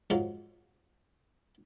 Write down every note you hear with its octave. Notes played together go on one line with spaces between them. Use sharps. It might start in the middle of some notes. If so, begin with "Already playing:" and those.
G#2 F3 F#3